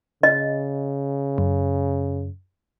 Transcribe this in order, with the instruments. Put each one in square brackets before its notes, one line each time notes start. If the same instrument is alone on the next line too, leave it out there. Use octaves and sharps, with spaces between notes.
[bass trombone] C#3 [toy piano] D#5
[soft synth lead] F#2